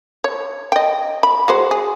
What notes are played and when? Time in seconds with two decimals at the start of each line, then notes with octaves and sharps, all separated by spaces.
0.24 C#5
0.72 D#5 G5
1.23 B5
1.48 G#3 F#4 C5
1.71 G#4